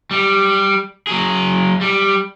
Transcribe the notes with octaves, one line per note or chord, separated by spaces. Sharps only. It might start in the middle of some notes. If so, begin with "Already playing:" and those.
G3
F#3 G#4
G3